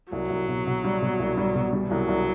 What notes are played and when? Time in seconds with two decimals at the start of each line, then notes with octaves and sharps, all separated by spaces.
0.12 C2 F#3
0.30 C2
0.48 B2
0.66 B2
0.84 G3
1.02 B2
1.20 C2
1.37 G3
1.55 B2
1.73 G3
1.91 C2 F#3
2.08 C2